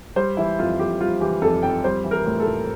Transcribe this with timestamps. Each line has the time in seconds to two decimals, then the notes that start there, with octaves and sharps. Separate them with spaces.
0.16 G3 C5
0.37 E3 E4
0.59 F2 F4
0.79 F2 G4
1.00 G3 F4
1.21 E3 G4
1.42 F2 A4
1.63 F2 G5
1.84 G3 C5
2.04 E3
2.11 A#4
2.26 A2
2.40 A4
2.46 A2